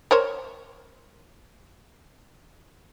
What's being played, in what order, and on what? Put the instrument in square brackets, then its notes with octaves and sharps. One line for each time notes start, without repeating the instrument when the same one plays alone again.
[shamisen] A#4 C5 C#5